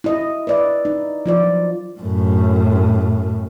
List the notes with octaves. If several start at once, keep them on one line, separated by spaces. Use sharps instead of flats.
E4 D#5
B4 D5 E5
D#4
F3 F4 D5
F#3
F#2 A2